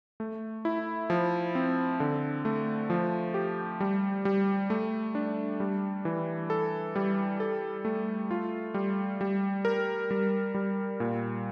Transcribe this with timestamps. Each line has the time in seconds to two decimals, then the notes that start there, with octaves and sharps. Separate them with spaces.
0.20 A3
0.65 E4
1.10 F3
1.55 C4
2.00 D3
2.45 A3
2.90 F3
3.34 G4
3.80 G3
4.25 G3
4.70 A3
5.15 D4
5.60 G3
6.05 E3
6.50 A4
6.96 G3
7.40 A4
7.85 A3
8.31 F4
8.74 G3
9.21 G3
9.65 A#4
10.11 G3
10.54 G3
11.00 A#2